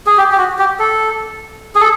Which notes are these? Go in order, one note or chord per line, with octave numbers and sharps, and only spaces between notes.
G#4
G4
G4
F#4
G4
A4
G#4
A4